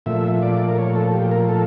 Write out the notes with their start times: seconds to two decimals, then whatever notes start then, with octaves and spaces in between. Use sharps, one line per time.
0.06 A#2 F3 A3 E5
0.42 D5
0.68 A#4
0.78 C#5
0.96 A4
1.14 G4
1.31 A#4
1.49 A4